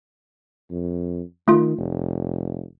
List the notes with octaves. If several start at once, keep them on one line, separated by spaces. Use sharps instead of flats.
F2
D#3 A3 F4
F1